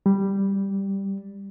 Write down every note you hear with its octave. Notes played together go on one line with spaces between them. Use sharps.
G3